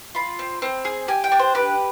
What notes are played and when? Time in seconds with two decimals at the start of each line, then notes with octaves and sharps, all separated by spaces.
0.15 F4 B5
0.39 C4
0.62 C4
0.85 G#4
1.08 G4 G#5
1.24 G5
1.32 D4
1.39 C5
1.55 G4 B4